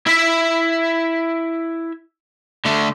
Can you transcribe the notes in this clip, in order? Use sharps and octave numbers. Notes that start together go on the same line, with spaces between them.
E4 E5
D3 A3